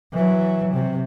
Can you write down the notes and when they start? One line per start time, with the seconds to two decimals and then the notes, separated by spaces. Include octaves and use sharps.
0.13 E3 F#3
0.73 C3